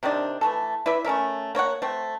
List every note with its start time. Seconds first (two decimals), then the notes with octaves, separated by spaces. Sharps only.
0.03 C3 D#3 C4 D4
0.41 E3 A3 A4
0.86 E4 B4 D5 E5
1.05 A3 C#4 A#4 E5
1.55 A#3 C#5 D#5 F#5
1.82 A3 C4